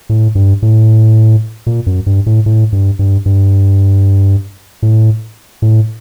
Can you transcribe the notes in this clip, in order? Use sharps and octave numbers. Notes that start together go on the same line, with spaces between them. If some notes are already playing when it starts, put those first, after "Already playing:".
A2
G2
A2
A#2
F#2
G2
A2
A2
G2
G2
G2
A2
A2